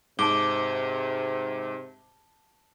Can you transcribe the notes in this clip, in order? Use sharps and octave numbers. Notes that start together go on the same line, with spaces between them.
G#2 C3 A5 D6 G7